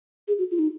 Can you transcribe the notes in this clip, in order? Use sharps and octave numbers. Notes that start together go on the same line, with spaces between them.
G#4
F#4
F4
D#4